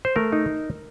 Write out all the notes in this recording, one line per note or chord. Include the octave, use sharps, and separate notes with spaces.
C5
A3 A#4
D#4